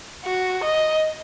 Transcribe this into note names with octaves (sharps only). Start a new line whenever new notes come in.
F#4
D#5